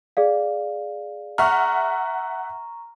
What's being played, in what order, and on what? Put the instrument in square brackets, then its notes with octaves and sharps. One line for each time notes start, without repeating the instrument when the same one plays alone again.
[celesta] G#4 D5 F5
[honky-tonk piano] E5 F#5 F6 [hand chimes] A#5 C#6